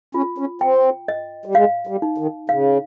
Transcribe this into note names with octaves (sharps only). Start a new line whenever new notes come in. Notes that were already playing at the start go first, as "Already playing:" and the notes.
C#4 F4
C#4
C4 G5
D#5
G3
G#3 F5
G3
D#4
D#3
C#3 F5